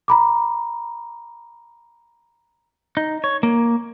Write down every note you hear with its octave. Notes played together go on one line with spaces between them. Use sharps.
A#5 B5 D6
D#4
C#5
A#3